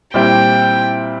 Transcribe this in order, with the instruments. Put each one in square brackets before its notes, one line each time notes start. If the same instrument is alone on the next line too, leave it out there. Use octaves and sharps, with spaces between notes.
[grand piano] A#2 G3 C4 E4 [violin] G5